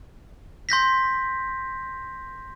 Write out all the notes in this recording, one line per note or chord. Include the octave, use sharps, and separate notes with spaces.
C6 G6 A#6 B6